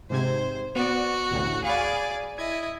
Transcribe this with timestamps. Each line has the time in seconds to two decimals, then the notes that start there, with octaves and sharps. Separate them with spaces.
0.10 G#2 C3 C5 G#6
0.76 B3 F#4 D5
1.31 A1 D2 A2
1.64 G#4 D5 F5 B5
2.38 E4 D#5 G#6